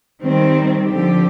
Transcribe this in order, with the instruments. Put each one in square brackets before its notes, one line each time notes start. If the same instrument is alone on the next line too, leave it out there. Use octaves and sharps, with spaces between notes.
[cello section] D#3 G3 C4
D3 F3 C4 G4